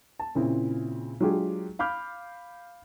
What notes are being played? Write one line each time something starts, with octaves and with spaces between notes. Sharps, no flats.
A5
A#2 C#3 C4 E4
F#3 G#3 D4 F4 G4 G#4
F5 B5 D6 F6 G6